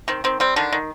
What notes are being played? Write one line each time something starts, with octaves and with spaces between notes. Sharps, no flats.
D#3 C4
D#3 C4
G3 C4
D3 D#3 D4
D#3